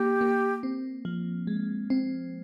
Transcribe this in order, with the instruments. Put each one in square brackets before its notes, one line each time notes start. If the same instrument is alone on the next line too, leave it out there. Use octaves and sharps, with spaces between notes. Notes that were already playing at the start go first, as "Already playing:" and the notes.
Already playing: [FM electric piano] A#3 [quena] G4
[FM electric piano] A#3
C4
F3
G#3
C4